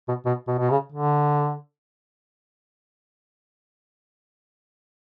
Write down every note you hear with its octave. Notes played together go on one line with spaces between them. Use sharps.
B2
B2
B2
B2
C#3
D3